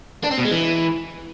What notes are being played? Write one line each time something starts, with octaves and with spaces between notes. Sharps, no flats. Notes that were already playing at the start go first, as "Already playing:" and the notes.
D4
C4
B2
G#3
E3